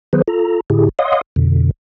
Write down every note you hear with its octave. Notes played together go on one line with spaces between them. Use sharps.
D#3 F#3 B3 G#4 B4 C5
F4 A4 A#5
A2 D3 E4 G4 G#4
C#5 D#5 F5 F#5 C6 D#6
F2 B2 D3